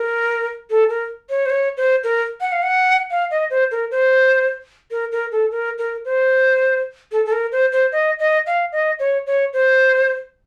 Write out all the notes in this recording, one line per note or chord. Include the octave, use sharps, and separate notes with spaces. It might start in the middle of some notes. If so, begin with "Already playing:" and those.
Already playing: A#4
A4
A#4
C#5
C5
C#5
C5
A#4
F#5
F5
F#5
F5
D#5
C5
A#4
C5
A#4
A#4
A4
A#4
A#4
C5
A4
A4
A#4
C5
C5
D#5
D#5
F5
D#5
C#5
C#5
C5